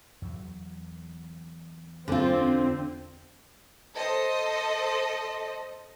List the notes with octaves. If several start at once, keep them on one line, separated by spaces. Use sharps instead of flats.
E2 F#3
E2 D3 C4 C#4 F4
A4 C5 D#5